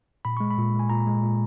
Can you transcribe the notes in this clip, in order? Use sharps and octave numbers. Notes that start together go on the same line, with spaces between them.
A#2 B5
G#3 C#6
B5
A#2
G#3
G#5
A#2 A#5
G#3
A#2